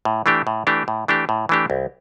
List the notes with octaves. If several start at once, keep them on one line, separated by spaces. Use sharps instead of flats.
A2
E3 A3 D4 G4
A2
E3 A3 D4 G4
A2
E3 A3 D4 G4
A2
E3 A3 D4 G4
C2